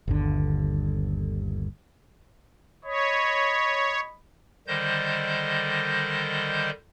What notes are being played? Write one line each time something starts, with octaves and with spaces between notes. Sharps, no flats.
G1 D#2 D3
C#5 D#5 B5
D3 D#3 G3 C5 D#5 G6